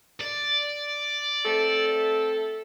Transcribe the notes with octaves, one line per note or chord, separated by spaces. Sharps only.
D5
A3 C4 A4